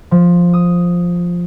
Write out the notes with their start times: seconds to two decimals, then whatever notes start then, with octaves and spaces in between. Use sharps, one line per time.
0.11 F3
0.54 D#6